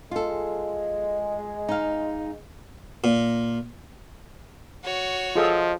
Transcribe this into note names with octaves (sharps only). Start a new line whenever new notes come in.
G#3 F4 A4
D#4 F5
A#2
F#4 C#5
F3 F4 G#4 A4 D#5